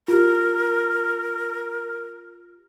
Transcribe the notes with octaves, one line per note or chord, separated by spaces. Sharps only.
F4 G4 A#4